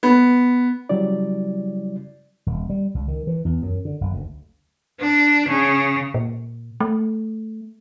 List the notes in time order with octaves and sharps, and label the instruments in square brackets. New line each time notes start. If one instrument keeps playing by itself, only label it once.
[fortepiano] B3
[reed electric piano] C#3 F#3 G3 E4 D5
[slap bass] D#1
G3
C#2
D#3
E3
E2
F#2
D3
F#1
D2
[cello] D4
C#3
[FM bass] A#2
A3